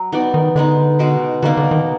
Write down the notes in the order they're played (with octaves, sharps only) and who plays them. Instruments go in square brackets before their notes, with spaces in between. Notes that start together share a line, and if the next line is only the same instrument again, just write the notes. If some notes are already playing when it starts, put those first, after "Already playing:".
Already playing: [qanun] F#3
B3 D#4 F#4 D5
[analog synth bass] D#3
[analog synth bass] D3 [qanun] G#3 B3 D#4
[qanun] B2 G#3 D#4 F#4
[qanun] B2 A#3 D#4 F#4 [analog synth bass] D3
[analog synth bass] D3
D#3